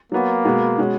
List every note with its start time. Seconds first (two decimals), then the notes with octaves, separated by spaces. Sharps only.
0.12 F#3 A#3 B3 F#4
0.45 B2 G#3 B3 F#4
0.78 B2 G#3 C#4 F#4